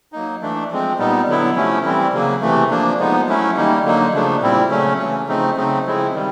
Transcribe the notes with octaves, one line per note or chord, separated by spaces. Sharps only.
F#3 A#3 D#4
E3 A3 D4
F3 G#3 C4
A#2 G3 B3 D#4
D3 F#3 B3 E4
C3 F3 A3 C#4 E4
E3 G3 C4 E4
C#3 F#3 A#3
C3 E3 A3
F3 A#3 D4
F3 G#3 B3 D#4
F#3 A3 C#4 E4
D#3 G3 A#3 D#4
D3 F#3 A#3 D#4
C#3 F3 A3 D4
A#2 G3 C4 E4
C#3 F#3 A3 C#4
E3 A3 C#4
C#3 F3 A3 C4 D#4
C#3 F#3 A3 C4 D#4
C#3 F3 G#3 C4 E4
D#3 G3